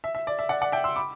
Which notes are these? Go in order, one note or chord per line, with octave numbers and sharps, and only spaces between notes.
E5
E5
D5
E5
D5 F#5
D5 F#5
E5 G5
C6 E6
B5 D6